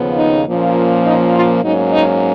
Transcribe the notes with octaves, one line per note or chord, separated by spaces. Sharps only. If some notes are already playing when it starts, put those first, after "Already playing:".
Already playing: D#2 C#3 F3 B3
D#4
A#2 F3 A#3 C#4
D#4
F4
G#2 F#3 A#3 C#4 D#4
D#4